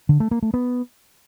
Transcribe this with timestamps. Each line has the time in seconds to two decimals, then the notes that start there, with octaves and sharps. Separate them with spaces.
0.09 D3
0.20 A3
0.31 A#3
0.42 A3
0.54 B3